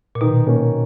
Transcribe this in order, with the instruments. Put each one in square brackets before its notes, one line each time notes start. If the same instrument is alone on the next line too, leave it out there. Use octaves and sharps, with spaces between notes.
[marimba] A#2
[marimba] B2 [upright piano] D#3
[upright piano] A#3 C#4